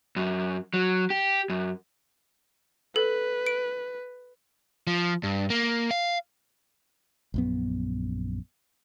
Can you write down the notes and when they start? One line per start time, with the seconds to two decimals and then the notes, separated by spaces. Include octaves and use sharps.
0.16 F#2
0.74 F#3
1.10 G4
1.49 F#2
2.96 A4 B4
3.47 D7
4.87 F3
5.23 G2
5.50 A#3
5.91 F5
7.34 A#1 F#2 B3